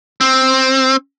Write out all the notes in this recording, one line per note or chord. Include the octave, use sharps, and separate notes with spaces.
C4